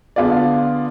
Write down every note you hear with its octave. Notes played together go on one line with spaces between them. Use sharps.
D3 B3 F4 G#4 D5